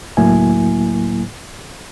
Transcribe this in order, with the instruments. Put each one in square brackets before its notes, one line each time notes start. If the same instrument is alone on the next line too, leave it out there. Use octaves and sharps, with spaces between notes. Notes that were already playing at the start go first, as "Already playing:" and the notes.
[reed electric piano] C#2 A2 F#3 A#3 E4 G#5